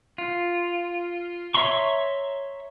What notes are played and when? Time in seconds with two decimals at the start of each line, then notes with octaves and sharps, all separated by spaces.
0.18 F4
1.54 C#5 E5 A#5 C6 C#6